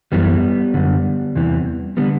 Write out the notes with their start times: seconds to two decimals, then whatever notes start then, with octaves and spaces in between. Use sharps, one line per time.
0.12 F#2 E3 G3 B3
0.74 F#2 D3
1.35 E2 C3 E3
1.97 D3 G3 B3